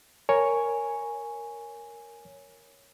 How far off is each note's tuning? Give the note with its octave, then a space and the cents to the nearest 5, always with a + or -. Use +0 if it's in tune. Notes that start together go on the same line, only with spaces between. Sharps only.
A#4 +0 C#5 +0 G#5 +0